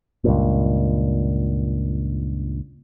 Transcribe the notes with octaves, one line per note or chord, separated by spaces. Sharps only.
C#2 G2 A#2